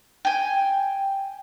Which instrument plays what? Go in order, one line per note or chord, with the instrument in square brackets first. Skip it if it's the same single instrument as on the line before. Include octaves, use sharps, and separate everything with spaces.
[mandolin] G5 G#5